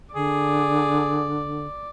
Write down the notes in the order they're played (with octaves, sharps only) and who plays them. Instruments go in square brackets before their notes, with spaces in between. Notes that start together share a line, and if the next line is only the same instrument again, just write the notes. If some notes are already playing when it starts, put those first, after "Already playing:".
[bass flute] D3 [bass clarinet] G#4 [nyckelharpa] D5